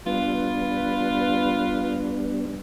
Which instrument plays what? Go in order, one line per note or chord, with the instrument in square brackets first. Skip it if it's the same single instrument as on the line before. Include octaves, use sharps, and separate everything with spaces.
[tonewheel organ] G3 B3 D4 [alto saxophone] F4 [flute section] B4